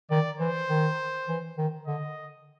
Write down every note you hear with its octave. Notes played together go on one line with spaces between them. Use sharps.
D#3 D5
E3 C5
D#3
E3
D#3
D3 D#5